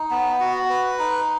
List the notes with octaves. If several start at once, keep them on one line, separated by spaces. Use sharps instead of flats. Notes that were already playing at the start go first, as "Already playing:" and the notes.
Already playing: D#4
B3
F#4
B4
D#4